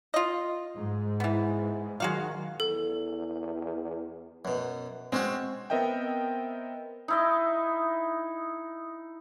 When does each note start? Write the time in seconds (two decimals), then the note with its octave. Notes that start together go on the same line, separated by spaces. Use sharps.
0.14 F4 D#5
0.75 G#2
1.20 E3 B3
2.00 D#3 F#3 G#3 F#4 F5
2.60 E2 A4
4.45 F#2 B2
5.12 G#3 C4 C#4 F#4
5.70 B3 C4 A#4 D#5 E5 G5
7.08 D#4 E4 D#5